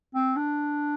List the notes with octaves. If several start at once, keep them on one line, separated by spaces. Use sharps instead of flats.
C4
D4